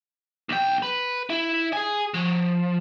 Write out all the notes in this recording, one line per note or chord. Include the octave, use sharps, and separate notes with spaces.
B1 G5
B4
E4
G#4 G#5
F3